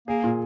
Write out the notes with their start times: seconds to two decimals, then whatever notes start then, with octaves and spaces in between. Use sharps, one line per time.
0.08 A#3 G#4
0.24 A#2